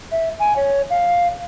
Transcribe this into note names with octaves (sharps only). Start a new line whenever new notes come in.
E5
G#5
C#5
F5